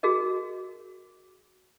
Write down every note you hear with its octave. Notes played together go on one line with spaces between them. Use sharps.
F#4 G#4 A#4 D#5